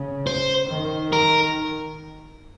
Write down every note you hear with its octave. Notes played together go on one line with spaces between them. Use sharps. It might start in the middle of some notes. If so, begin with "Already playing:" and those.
Already playing: C#3
C5
D#3
A#4